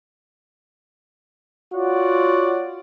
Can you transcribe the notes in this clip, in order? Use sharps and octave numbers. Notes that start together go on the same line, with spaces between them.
F4 F#4 C#5 D5 F#5